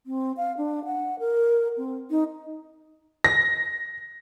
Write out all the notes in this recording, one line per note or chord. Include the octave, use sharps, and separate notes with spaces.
C4
F5
D4
F#5
A#4
C4
D#4
A#6